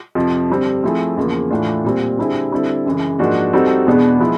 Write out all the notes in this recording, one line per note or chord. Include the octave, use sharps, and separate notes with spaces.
F2 C3 F3
G2 D3 G3 C4
F3 A3 C4 E4 G#4
E2 C#3 F3 A#3
A2 E3 A3 D4 F4
A#2 G3 C4
D3 G3 C4 E4 G#4
D3 G3 C4 E4 A4
F#2 C#3 E3 G#3
G#2 F3 A#3 D4 F#4
G3 C4 D#4 F#4 A4
E2 B2 G#3 B3 D4
F3 G#3 B3 E4